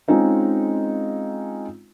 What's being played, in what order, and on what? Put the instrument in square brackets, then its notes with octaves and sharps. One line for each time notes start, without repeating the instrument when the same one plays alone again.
[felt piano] G#3 C4 C#4 D#4 F4